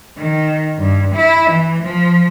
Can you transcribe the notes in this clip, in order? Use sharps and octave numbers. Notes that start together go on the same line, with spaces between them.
D#3
G2
E4
E3
F3